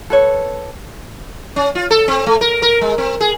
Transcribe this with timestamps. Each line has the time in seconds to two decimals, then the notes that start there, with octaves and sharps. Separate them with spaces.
0.10 A4 B4 C#5
1.56 C#4
1.75 F4
1.91 A4
2.08 C4
2.26 A3
2.41 A#4
2.62 A#4
2.81 G#3
2.98 C4
3.21 G#4